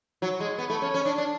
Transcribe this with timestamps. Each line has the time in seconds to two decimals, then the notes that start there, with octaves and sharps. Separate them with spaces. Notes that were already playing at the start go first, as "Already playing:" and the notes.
0.22 F#3
0.40 G#3
0.58 B3
0.70 A3
0.82 C#4
0.94 C#4
1.06 D4
1.18 D4